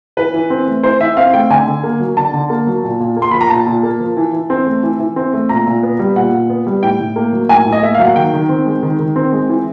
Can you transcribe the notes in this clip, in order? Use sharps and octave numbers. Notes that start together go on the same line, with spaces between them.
E3 B4
E3
C4
A3
E3 C5
E3 E5
C4 F5
A3 G5
D3 G#5
D3
A#3
F#3
D3 A5
D3
A#3
F#3
A#2
A#2
A#3
C6
F3 B5
A#5
A#2 A5
A#2
A#3
F3
E3
E3
C4
A3
E3
E3
C4
A3
A#2 A#5
A#2
B3
G3
A#2 F#5
A#2
B3
G3
A2 G5
A2
A#3
F#3
A2 G#5
A2
D#5
A#3 E5
F#3 F5
F#5
D#3 G5
D#3
C4
G#3
D#3
D#3
C4
G#3
E3